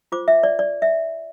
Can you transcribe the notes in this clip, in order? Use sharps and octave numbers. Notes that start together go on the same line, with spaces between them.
F4 C5 D6
E5
D5
D5
E5